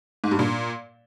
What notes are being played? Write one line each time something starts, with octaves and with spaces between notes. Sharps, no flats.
G#2
G2
A#2